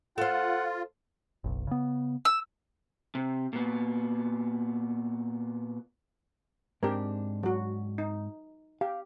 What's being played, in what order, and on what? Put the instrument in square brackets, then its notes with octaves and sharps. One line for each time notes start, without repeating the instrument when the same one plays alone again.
[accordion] F4 [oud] A4 C5 [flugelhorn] F#5
[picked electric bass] F#1 B1
C#3 B3
[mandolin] E6
[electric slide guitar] C3
A#2 B3
[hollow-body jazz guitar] G#2 C4 D4 [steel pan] G4 A#4
[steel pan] F#3 F#4
D#4
[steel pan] G4 [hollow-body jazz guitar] F5